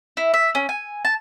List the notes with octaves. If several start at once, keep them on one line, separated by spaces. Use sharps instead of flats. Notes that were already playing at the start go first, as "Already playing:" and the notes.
E4
E5
C#4
G#5
A5